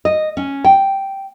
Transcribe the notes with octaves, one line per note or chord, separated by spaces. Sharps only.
D#5
C#4
G5